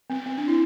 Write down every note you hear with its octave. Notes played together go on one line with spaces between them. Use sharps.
C4
C4
D4
E4